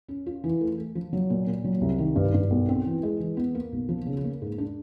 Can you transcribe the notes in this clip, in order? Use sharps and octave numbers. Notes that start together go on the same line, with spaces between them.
C#4
F4
E3
A3
A3
F3
F#3
A#2
A#2
F#3
C2
D#3
G2
G2
B1
C4
E3
G#3
E3
B3
A#3
B1
F3
C#3
A#3
G#2
D4